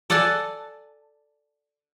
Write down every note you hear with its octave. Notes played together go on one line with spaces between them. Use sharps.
A4 D5 F#5 G#5 A5